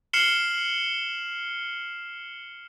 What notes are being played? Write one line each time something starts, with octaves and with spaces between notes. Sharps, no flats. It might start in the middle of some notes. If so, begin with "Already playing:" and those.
F6 C7 C#7 E7 F#7 G7